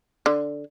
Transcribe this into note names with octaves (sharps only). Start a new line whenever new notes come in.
D3